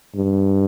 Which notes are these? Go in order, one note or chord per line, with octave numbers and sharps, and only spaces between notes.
G2